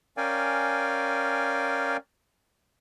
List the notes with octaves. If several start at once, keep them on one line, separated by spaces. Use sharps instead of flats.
C#4 A#4 D5 F5 G5 G#5